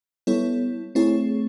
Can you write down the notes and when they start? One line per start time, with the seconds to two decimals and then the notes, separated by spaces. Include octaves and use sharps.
0.27 G3 B3 E4 A4 C#5
0.95 A3 C4 E4 G#4 C#5